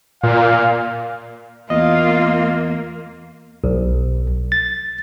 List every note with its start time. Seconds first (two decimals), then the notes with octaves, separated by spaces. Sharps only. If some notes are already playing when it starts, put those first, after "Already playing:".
0.23 A#2 F5
1.70 E2 A#3 F4 D#5
3.64 B1
4.52 A6